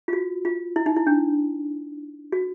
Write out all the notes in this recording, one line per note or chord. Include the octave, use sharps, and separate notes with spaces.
F4
F#4
F4
E4
D#4
E4
D4
F#4